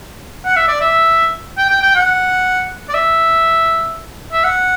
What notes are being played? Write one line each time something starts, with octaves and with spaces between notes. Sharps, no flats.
F#5
E5
D5
E5
G5
G5
G5
F#5
D5
E5
E5
F#5